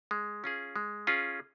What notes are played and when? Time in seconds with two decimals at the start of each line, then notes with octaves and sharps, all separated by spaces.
0.11 G#3
0.44 C#4 F4 G#4
0.76 G#3
1.07 C#4 F4 G#4